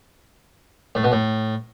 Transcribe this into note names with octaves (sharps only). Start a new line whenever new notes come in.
A2
B2
A2